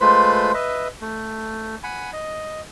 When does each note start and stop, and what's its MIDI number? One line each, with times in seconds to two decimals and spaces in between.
0.01 0.52 56
0.01 0.52 57
0.01 0.52 65
0.01 0.52 71
0.01 0.52 72
0.01 0.52 83
0.54 0.88 71
0.54 0.88 75
0.54 0.88 76
1.01 1.76 57
1.84 2.11 78
1.84 2.11 80
1.84 2.11 83
2.13 2.61 75